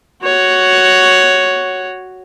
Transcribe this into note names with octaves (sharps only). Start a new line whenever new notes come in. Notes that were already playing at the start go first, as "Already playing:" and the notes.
F#4 C#5